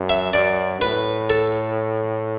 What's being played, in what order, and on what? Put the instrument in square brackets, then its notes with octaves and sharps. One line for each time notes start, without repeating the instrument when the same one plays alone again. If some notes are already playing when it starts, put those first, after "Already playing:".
Already playing: [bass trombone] F#2
[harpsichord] E5
[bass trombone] F#2 [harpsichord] D5
[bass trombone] A2 [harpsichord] B4
[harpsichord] A4